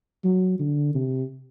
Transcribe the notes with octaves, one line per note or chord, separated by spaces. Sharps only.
F#3
D3
C3